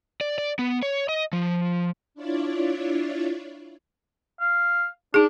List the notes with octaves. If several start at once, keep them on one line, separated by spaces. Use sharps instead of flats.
D5
D5
B3
C#5
D#5
F3
D4 E4 F4 C#5 D5
F5
D4 D#4 G#4